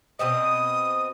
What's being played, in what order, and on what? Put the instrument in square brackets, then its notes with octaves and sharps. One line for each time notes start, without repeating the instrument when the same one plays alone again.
[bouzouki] B2 C4 D#5 [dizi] D#6